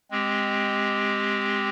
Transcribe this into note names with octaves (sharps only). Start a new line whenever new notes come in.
G#3 C4 G4